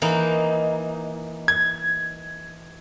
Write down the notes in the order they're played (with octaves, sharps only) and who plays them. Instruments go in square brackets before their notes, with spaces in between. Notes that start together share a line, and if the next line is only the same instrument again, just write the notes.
[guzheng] E3 A#3 D#4
[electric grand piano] G#6